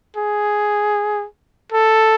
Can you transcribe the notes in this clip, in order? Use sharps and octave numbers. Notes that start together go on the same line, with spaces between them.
G#4
A4